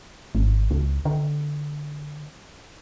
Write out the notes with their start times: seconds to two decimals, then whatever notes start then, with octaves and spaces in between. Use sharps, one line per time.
0.35 G#1
0.71 C#2
1.05 D3